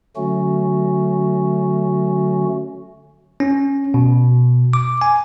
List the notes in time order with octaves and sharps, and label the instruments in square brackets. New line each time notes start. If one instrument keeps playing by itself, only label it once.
[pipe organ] D3 F#3 A3 C#4 F#4
[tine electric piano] C#4
B2
D6
G#5